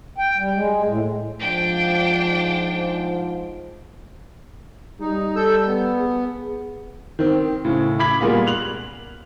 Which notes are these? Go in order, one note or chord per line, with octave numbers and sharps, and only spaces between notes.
G5
G3
G#3
A2
G#2 F3 D4 G5
G3 D#4
A4 E6 G6
B3
G#4
D#3 C4
A2 C#3
B5 D6 G#6 B6 F#7
A#2 G3 G#3 A#3 B3
F#6 F7 F#7